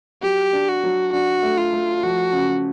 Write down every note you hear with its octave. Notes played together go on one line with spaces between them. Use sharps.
F#3 G4
D4
F#4
F#3
D4 F#4
A3
F4
A3
F3 F#4
C#3